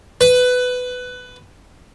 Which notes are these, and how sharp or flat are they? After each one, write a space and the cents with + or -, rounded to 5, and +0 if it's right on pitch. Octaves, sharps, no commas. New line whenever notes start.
B4 +15